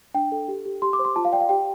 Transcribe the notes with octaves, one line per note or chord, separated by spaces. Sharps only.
D4 G5
A4
G4
G4
G4 C6
D6
C5
C6
F4 A5
F5
D5 G5
F5
G4 G5